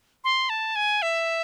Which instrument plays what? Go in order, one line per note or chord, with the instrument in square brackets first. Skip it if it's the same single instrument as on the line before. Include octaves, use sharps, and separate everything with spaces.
[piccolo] C6
A5
G#5
E5